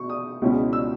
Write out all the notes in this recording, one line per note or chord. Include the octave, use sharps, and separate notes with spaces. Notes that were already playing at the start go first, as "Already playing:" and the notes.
Already playing: B2 C#6
D#6
C#2 B2 G#3 C#4 E4
E6